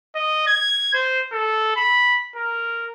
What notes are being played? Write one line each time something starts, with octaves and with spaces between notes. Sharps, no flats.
D#5
G#6
C5
A4
B5
A#4